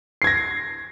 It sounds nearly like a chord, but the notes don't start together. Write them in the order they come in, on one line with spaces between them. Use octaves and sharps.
C7 G#6 A#6